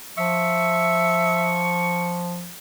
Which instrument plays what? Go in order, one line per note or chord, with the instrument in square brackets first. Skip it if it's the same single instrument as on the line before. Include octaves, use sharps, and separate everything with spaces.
[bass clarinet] F3 [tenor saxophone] E5 [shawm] C#6